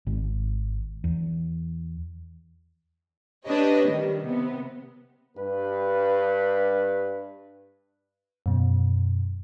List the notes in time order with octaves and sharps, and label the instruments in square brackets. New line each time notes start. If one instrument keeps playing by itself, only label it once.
[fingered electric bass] G#1
E2
[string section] D4 G4 B4 C#5 D#5
D#3 G3
C3 B3
[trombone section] G2 B4
[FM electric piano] F#2 B2